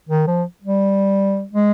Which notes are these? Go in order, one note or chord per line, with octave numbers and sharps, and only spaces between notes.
D#3
F3
G3
G#3